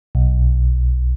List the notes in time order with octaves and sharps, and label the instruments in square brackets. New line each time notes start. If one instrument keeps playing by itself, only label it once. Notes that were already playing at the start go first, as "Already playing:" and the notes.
[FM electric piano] B1